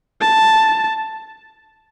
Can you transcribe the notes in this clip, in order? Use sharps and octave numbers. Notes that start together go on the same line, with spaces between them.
A5